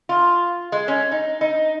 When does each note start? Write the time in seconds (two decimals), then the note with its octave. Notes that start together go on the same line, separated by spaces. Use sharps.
0.09 F4
0.72 G#3
0.88 C#4
1.11 D#4
1.41 D#4